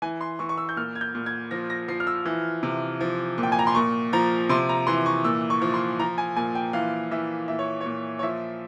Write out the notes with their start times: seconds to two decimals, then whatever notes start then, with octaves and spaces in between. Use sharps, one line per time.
0.02 E3 G#5
0.21 C6
0.39 E3 C#6
0.49 C#6
0.58 E6
0.69 G6
0.77 A#2 F6
0.95 G#6
1.01 G6
1.15 A#2
1.26 G#6
1.51 F3 A#6
1.70 A#6
1.88 F3 C7
2.00 F6
2.07 E6
2.26 E3
2.63 C3
3.01 F3
3.38 A#2
3.43 G5
3.52 G#5
3.59 A#5
3.67 C6
3.75 A#2 C#6
4.13 F3 A#5
4.49 C3 C6
4.69 A#5
4.87 E3 C6
5.06 C#6
5.24 A#2 E6
5.50 C#6
5.62 F3
5.74 C6
6.00 F3 A#5
6.18 G#5
6.36 A#2 G#5
6.55 G5
6.73 E3 F5
7.11 E3 E5
7.48 A#2 E5
7.59 C#5
7.81 C#5
7.86 A#2
8.19 C#5
8.23 F3 E5